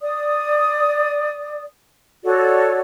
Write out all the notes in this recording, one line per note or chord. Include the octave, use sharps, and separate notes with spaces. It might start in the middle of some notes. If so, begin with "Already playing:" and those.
D5 D#6
F#4 A4 C#5 D5